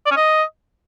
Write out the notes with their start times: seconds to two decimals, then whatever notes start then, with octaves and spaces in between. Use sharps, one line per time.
0.06 D5
0.11 C#4
0.16 D#5